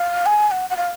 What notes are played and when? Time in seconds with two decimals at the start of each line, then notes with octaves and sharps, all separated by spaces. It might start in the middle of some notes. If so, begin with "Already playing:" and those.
Already playing: F5
0.26 G#5
0.51 F#5
0.70 F#5
0.77 F5